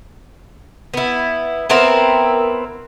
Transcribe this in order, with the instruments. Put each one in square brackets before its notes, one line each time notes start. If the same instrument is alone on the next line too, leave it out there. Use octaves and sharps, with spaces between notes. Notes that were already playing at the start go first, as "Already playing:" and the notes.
[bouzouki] B3 E4
B3 C4 E4 A#4